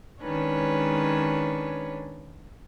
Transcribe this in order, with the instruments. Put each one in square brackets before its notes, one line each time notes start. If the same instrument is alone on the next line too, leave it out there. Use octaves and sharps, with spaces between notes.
[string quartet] D#3 G#3 C#4 D4 B4 C#5